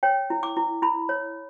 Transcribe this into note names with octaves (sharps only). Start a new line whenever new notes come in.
C#5 G5
E4
D6
E4
E4 B5
C#5